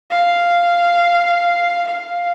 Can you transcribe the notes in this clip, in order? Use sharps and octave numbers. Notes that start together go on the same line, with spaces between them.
F5
F5